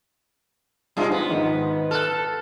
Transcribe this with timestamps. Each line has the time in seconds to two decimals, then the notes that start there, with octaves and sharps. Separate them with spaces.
0.97 G2 C3 G#3 D4 D#4 F4
1.12 B3
1.30 G#2 D#3
1.91 A4 F6 F#6